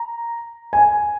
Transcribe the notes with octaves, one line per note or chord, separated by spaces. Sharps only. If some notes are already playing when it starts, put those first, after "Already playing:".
Already playing: A#5
G#5